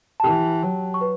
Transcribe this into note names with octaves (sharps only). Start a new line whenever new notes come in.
A5
E3 G4 G5
F#3
C#6
B4